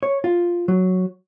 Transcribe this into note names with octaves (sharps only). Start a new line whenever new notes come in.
C#5
F4
F#3